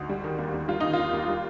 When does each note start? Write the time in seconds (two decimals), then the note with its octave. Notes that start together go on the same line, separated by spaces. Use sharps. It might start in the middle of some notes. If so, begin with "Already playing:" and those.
Already playing: D2 D#4
0.09 G3
0.24 D#3
0.39 D#2
0.54 D#2
0.68 G3 F4
0.80 D#3 D#4
0.93 F4
0.99 D#2
1.13 D#2
1.28 G3